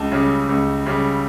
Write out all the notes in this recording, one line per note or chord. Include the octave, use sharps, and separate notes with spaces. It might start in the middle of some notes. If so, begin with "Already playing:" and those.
Already playing: C#2 A5
C#3 G3
C#2
C#3 G3